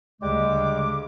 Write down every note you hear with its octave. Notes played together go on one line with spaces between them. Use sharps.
D2 C#3 G3 G#3 D6